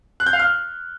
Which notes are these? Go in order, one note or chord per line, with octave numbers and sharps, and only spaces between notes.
F#6
G6
F5
F6